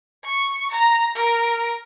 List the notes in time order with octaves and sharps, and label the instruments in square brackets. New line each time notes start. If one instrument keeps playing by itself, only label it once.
[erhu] C#6
A#5
A#4